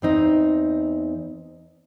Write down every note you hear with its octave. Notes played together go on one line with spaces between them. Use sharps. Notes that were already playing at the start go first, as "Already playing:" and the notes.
E2 C4 D#4